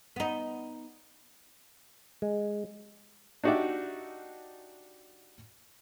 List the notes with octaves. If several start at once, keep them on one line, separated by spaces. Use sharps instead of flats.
B3 D#4
G#3
D4 D#4 F#4 G4 D5 E5